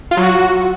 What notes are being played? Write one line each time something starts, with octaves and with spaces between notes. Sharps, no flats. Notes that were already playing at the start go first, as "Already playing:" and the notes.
F4
F#3
F#4